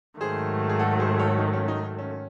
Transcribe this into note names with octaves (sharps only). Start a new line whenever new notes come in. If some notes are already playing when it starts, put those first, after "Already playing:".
G#2 D#3 F#3 A3 G#4 C5
G#4
F#4 A4
G#4 C5
A4 C#5
D#4
C#4
D#4
C#4